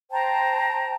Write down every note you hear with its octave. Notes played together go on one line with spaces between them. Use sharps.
C5 G5 A5 A#5